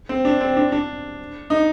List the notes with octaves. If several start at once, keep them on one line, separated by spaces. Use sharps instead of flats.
C4
D4
C4
D4
D4
D#4